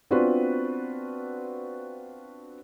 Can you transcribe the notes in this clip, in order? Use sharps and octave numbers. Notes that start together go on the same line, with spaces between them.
B3 C4 D4 F4 F#4 B4